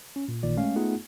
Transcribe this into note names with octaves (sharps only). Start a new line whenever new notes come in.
C#4
A#2
A1 A#2 D#3 D5
G#3 A3 C#4 F5
A3 B3 D#4 F4 G#4 F#5